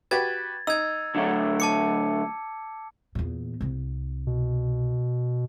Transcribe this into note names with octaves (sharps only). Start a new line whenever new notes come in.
F#4 G4 B4 G#6 A6
D#4 E6 G#6
D3 F#3 A3
A5 D6 C#7
E2 A#2
C2 C3
B2